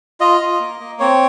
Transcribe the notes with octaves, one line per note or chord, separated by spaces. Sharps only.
F4 D#5
F4
A#3
A#3
C4 C#5